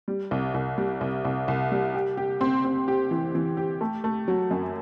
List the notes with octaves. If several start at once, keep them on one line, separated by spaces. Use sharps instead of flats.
G3
C2
C2
G3
C2
C2
C2
G3
G4
G4
C4
C4
G4
E3
E3
G4
A3
A3
F#3
F#2